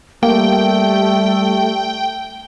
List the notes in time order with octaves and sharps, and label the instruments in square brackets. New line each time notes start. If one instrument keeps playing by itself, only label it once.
[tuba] G3 [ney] A3 [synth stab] A#3 [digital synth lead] G5